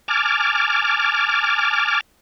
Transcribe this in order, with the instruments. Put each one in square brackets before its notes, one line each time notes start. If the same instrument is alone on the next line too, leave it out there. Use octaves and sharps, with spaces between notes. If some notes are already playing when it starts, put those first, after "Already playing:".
[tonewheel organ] G#5 A5 D6 F6